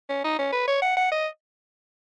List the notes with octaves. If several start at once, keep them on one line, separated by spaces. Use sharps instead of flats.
C#4
D#4
C#4
B4
C#5
F#5
F#5
D#5